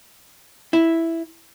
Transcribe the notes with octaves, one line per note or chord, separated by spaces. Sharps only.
E4